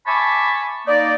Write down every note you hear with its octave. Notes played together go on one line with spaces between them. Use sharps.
E5 G#5 A5 B5 C#6 D6
A#3 D#4 D5